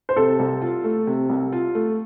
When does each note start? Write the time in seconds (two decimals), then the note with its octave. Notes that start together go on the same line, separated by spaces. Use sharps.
0.09 C5
0.16 C3 A4
0.39 C2
0.62 F4
0.84 A3
1.07 C3
1.29 C2
1.52 F4
1.75 A3